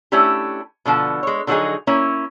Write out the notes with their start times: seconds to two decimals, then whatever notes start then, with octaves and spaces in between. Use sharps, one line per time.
0.12 A3 C#4 D4 E4 G4
0.85 B2 D3 F3 A5
1.23 G#3 C#5
1.47 D3 F3 F#3 C4 D#4 G#4
1.87 A#3 C#4 E4